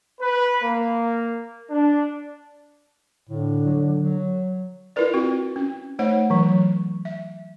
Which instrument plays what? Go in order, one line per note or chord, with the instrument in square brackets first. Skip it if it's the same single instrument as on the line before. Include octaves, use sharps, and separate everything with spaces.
[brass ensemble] B4
A#3
D4
[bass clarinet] A2 [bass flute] D3
[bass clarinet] F#3
F#3
[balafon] E4 F4 A#4 B4 D5
C4 F4 F#4
C#4
A3 D#4 C5 C#5 F#5
E3 F#3
E5